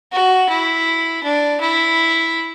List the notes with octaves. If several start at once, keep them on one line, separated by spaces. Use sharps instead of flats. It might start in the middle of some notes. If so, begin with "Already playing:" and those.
F#4
E4
D4
E4